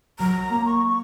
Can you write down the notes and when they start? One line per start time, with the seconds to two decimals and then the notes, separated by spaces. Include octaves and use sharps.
0.19 F#3 A#5
0.50 A#3
0.66 C#6